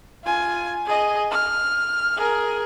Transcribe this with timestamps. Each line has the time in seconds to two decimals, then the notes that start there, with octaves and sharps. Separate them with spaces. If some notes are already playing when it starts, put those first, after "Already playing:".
0.25 F4 G#5
0.86 G#4 D#5
1.31 F6
2.16 G#4 A#4